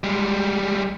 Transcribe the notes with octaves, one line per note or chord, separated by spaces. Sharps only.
G3 G#3